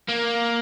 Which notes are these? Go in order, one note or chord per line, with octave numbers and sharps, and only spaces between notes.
A#3